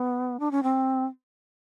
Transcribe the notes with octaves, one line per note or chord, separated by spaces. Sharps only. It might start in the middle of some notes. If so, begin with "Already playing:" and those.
Already playing: B3
D4
C#4
C4